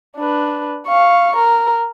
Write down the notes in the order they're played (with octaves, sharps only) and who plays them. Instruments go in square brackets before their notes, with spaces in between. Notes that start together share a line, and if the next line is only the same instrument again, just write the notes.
[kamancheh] D4 B4
F5 C#6
A#4